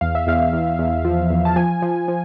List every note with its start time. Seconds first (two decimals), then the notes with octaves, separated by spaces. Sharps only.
0.01 E2 F5
0.15 E5
0.27 E2 F5
0.53 E2
0.79 E2
1.05 F3
1.30 E2
1.45 A5
1.56 F3 G#5
1.82 F3
2.08 F3